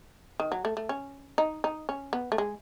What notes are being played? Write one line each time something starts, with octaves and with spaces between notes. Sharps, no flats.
D#3
F#3
A3
A3
C#4
D#4
D#4
C#4
B3
A3
G#3